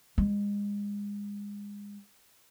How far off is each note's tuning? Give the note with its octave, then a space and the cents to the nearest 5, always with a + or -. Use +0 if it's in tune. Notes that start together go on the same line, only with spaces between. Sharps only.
G#3 -30